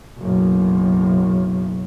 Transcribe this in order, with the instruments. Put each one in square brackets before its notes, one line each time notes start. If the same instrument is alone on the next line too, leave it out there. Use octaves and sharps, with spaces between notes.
[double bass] F#1 B1